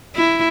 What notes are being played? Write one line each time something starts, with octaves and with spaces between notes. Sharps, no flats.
E4